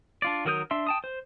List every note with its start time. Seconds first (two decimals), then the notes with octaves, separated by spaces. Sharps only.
0.22 D4 F4 D5
0.45 D#3 F#3 A#4 D#6 G6
0.71 D4 E5 C6
0.87 G5 A5 D#6
1.04 C5